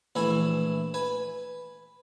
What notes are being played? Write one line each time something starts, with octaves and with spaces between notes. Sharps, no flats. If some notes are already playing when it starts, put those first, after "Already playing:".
A#1 E3 A3 E4 G#5
B4 G#5